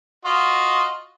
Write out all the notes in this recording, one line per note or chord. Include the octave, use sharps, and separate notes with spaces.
F4 F#4 D#5